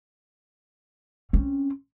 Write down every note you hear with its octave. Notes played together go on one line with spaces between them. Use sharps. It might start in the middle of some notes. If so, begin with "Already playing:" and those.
C4 C#4